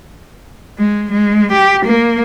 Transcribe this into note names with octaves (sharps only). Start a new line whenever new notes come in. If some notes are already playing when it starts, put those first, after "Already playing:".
G#3
G#3
G4
A#3